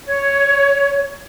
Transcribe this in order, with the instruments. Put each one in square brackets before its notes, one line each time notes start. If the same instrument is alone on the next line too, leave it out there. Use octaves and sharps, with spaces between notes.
[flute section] C#5